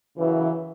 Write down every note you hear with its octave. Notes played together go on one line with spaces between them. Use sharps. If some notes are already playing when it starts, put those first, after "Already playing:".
F#2 C#3 E3